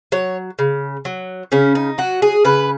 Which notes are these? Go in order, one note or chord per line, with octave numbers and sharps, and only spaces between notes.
F#3 C#5
C#3
F#3
C#3 C#4
D#4
F#3 F#4
G#4
C#3 B4